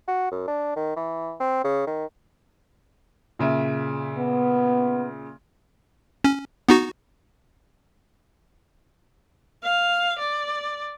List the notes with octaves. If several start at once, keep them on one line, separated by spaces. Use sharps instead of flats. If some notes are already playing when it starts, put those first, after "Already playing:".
F#4
F#2
D4
D#3
E3
C4
C#3
D#3
A#2 C#3 E5
B3
C#4
B3 D#4 F#4
F5
D5